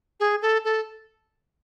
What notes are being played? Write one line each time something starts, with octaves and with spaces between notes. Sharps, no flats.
G#4
A4
A4